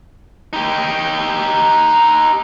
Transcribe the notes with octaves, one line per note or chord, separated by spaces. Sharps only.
D#4 G4